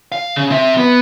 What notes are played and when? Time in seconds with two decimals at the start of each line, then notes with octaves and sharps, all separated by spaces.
0.12 F5
0.36 C#3
0.50 C4 E5
0.77 B3